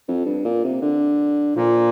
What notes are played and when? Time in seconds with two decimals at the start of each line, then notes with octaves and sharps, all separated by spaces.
0.08 F2
0.26 G2
0.45 A#2
0.64 C3
0.82 D3
1.56 A#2 F3